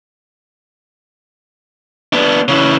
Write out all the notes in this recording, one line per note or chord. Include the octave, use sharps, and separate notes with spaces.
B3 D4
C#3 E3